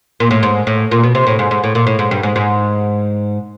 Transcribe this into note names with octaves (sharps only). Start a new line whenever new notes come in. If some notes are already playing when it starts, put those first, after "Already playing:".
A#2
A2
G#2
A2
A#2
B2
C3
A2
G#2
G#2
A2
A#2
A2
G#2
G2
G#2
G#2